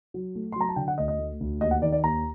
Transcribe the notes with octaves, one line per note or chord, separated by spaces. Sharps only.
F#3
A3
C6
F#3 A#5
A5
D3 G5
F#5
D2 D#5
D#5
A3
D2
D#2 D#5
F#5
D#3 D5
D5
D#2 A#5